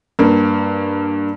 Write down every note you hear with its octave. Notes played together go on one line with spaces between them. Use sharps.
G2 A#3